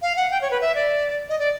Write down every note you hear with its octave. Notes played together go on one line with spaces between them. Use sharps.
F5
F#5
G5
C#5
B4
E5
D5
D#5
D5